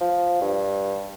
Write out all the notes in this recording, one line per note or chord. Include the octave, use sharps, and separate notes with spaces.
F3
G2